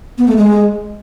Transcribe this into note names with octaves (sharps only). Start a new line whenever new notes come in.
B3
A3
G#3